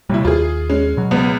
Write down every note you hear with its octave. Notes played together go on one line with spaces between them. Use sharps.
D#2 C3 G3 E4
D#2 F4 G#4
G#3 C#4
B2 F#3
C#2 B3